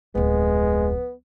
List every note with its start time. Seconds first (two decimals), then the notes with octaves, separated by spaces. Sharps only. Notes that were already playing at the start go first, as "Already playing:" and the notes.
0.15 D1 F2 G#3 B3